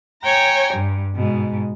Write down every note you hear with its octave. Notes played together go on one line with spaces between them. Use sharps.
C#5 G5 G#5 A#5
G2
G#2 B2